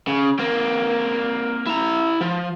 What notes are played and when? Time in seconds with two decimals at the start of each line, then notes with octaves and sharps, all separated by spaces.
0.07 C#3
0.39 A#3 C4
1.67 E4 A#5
2.21 F3